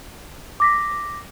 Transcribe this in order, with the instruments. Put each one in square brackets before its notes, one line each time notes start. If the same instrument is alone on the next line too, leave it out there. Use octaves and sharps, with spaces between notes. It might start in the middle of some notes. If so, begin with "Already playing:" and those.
[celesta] D6 A#6 B6